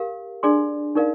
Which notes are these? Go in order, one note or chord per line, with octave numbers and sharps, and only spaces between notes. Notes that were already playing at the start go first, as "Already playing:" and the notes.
Already playing: G4 A#4 F5
D4 G#4 D5 G#5 C6
D#4 A#4 D5 F5